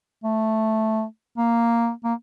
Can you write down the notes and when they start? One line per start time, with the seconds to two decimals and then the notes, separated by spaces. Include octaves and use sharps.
0.24 A3
1.38 A#3
2.04 A#3